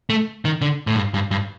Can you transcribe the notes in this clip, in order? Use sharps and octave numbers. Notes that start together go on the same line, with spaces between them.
A3
D#3
D3
A2
G2
G2
G2